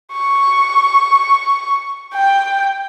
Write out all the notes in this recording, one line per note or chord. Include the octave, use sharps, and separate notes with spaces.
C#6
G5